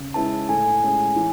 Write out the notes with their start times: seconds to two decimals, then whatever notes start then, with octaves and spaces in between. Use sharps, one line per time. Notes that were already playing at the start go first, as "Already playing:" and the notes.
Already playing: C#3
0.14 G#3 C#4 E4 B4 A5
0.49 A2 G#5
0.83 G#3 C#4 G#4
1.16 E3